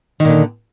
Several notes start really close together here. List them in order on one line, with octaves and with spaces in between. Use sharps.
D#3 A#2 D3